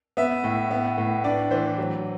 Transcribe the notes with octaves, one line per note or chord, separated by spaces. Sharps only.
B3 E5
A2
B3
A2
D4 D5
E3 C5
F#3